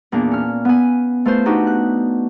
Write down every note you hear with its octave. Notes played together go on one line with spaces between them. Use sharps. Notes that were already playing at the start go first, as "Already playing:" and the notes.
E2 A#2 A#3 D4
C#4 F6
B3 G#5
A3 F4 B4 C5
B3 D4 D#4 F#4 G4
F#6